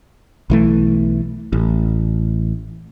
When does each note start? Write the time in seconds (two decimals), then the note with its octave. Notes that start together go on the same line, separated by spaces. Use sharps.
0.50 B1 E3 A3
1.53 A1